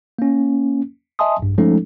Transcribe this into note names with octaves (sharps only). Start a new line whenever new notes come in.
A#3 C#4
D#5 E5 G#5 A5 C6 D#6
A#1 G2
F3 G#3 A3 C#4 D#4 A4